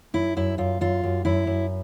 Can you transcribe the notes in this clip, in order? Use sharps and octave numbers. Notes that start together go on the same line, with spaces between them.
F#2 E4
F#2 E4
F#2 F4
F#2 F4
F#2
F#2 E4
F#2